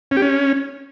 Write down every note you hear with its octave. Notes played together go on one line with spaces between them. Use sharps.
C#4
G4
C#4